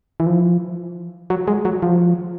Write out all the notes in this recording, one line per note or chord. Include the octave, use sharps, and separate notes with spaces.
E3
F3
F#3
G#3
F#3
F3